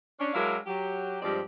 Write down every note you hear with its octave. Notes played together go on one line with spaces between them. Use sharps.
C#4 D4
F#3 G#3 D4 E4 A#4 F5
F#3 G4
G2 F3 G#3 C4 G4 D5